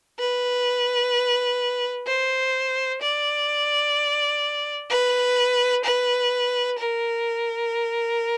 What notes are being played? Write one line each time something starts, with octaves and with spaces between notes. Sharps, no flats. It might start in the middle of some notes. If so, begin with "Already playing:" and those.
B4
C5
D5
B4
B4
A#4